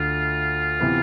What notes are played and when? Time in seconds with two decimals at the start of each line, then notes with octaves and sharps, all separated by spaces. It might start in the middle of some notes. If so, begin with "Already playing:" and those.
Already playing: D2 D3 A3 F4
0.80 C3 E3 B3